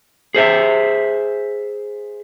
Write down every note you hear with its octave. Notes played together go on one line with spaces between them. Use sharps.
G#4 C5 E5